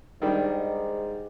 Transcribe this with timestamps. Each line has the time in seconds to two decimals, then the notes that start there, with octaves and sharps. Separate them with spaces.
0.22 G#2 D#3 G3 D4